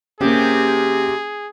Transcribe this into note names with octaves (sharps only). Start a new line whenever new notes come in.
C3 A#3 C#4 G4 G#4